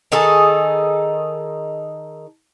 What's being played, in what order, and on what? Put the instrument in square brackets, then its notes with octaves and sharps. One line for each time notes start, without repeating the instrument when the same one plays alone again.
[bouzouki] D#3 D#4 G#4 A4